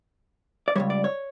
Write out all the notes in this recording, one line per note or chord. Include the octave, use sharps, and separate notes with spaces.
D5
C#2 B2 G3 C#5
D5
C#5